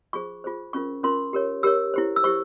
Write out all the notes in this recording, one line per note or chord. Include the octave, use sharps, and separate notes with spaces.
F4 G#4 C5 C#6
F4 G#4 C5
C#4 F4 A#4 C#6
C#4 F4 A#4 C6
G4 A#4 C#5
G4 A#4 C#5 E6
E4 G4 C5
E6
E4 G4 C5 C#6